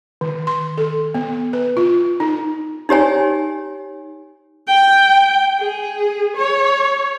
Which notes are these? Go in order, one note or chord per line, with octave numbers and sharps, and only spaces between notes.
D#3
C6
A4
B3
B4
F4
D#4
D#4 G4 C#5 G#5
G5
G#4
C#5